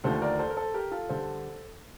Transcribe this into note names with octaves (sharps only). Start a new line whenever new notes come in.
D#2 D3 F3 A3 A4 C5
A#4 D5
A4 C5
A#4
A4 C5
G4 A#4
F4 A4
D3 G3 A4 C5